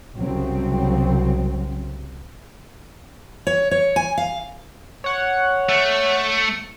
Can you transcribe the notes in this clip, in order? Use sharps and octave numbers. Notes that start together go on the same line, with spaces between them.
C2 C#3 F#3 C4
C#5
C#5
G#5
F5
C#5 F#5
A3